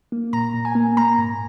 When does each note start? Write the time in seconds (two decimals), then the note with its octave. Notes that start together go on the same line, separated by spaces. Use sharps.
0.12 A#3
0.33 A#2 A#5
0.54 A#2
0.65 G#5
0.75 A#3
0.97 A#3 A#5
1.18 G#2